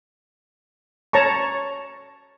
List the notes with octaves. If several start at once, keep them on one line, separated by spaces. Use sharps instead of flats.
C#5 A5 A#5 C#6